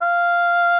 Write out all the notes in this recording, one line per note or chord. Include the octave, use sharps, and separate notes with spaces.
F5